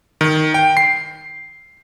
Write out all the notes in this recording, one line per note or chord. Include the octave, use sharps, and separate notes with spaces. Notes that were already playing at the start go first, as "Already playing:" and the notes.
D#3
G5
C7